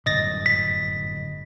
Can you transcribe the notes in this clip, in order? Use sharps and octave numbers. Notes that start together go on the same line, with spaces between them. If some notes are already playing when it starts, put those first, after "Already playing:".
G1 F#2 A2 D#5 A6 A#6
B6